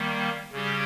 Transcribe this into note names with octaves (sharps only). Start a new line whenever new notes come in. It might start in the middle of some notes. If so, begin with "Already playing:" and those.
Already playing: D#3 G3 A#3
C#3 G3 C#4 G4